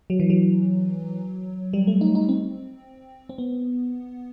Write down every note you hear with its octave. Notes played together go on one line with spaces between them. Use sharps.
F#3
E3
F#3
G3
A3
D#4
D#4
C4
C4
B3